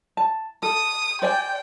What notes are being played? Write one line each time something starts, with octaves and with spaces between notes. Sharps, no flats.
A5
A4 D#6
C5 D5 G5 G#5